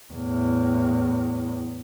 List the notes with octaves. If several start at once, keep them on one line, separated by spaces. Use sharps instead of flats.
E2 A2